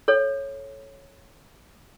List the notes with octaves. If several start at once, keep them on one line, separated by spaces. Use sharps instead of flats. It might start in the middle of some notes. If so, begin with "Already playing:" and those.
A4 C#5